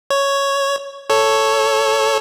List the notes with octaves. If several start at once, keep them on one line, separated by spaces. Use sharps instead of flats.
C#5
A4 C#5